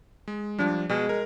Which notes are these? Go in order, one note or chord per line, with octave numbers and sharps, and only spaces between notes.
G#3
F3 G3 D4
B2 G#3
A#4